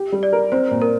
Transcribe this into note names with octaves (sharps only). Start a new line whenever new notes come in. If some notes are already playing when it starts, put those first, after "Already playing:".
Already playing: G4
G3
D5
A#4
C4 C5
A#2
A#4